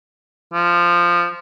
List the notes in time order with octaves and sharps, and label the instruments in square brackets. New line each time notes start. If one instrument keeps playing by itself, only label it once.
[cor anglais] F3